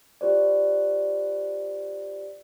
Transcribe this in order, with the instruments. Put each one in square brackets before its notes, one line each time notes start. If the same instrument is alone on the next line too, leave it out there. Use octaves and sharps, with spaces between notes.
[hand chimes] F4 G4 C5 D5